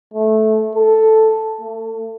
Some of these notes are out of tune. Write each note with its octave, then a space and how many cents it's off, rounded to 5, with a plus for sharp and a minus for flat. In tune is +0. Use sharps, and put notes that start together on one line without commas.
A3 -15
A4 +0
A3 +35